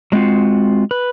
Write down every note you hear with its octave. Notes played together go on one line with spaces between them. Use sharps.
F#3 G#3 C4 F4 F#4
B4